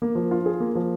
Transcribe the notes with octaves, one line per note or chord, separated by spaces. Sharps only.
A#3
F3
F4
G#4
A#3
F3